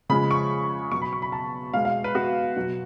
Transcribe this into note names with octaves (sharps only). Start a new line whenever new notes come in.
C#3 F3 G#3 B5
C#6
B2 F#3 C#6
B5
C#6
B5
A5
B2 G#3 F5
F5
B4
F#4
B2 F#3